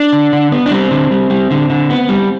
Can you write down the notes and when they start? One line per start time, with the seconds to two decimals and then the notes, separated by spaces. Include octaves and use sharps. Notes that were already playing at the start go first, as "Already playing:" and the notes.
Already playing: D4
0.13 D3
0.33 D3
0.52 B3
0.66 D4
0.71 G3 C4
0.91 D3
1.11 G3
1.30 G3
1.50 D3
1.70 D3
1.90 B3
2.09 G3